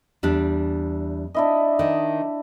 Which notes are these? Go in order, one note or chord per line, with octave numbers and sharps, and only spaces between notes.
E2 G3 D4
D4 E4 D#5
D#3